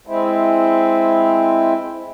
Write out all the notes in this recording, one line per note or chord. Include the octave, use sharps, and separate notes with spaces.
G#3 C4 E4